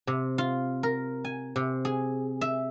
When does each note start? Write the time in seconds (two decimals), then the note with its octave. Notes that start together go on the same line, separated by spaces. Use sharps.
0.07 C3
0.38 F4
0.83 A#4
1.25 G#5
1.56 C3
1.85 G#4
2.41 E5